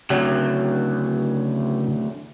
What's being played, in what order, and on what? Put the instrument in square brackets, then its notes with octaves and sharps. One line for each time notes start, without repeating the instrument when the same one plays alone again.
[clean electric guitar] D2 F#3 [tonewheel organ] C#3